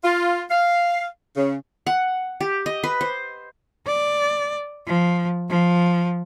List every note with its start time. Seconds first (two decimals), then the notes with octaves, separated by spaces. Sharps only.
0.04 F4
0.51 F5
1.36 C#3
1.87 F#5
2.40 G4
2.66 D#5
2.84 B4
3.01 C5
3.86 D5
4.87 F3
5.49 F3